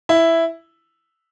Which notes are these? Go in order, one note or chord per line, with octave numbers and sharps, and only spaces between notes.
E4